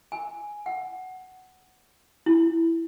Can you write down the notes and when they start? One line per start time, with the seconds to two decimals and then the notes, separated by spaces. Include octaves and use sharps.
0.12 G#5
0.66 F#5
2.26 E4